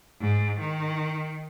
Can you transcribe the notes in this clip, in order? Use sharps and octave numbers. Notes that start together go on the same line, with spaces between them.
G#2
D#3